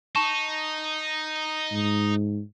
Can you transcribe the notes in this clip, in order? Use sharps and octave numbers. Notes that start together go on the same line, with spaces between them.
D#4 A5 C#6 E7
G#2